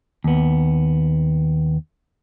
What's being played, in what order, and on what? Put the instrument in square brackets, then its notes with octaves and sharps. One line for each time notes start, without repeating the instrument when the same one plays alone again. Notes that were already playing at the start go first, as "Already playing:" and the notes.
[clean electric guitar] D#2 B3